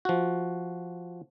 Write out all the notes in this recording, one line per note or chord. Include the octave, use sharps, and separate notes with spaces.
F3 F#4